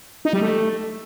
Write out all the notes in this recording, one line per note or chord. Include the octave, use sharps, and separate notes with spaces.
D#4
G3
A3